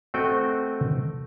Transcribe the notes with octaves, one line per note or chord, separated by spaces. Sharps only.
A3 C4 F#4 A4 D#5 G5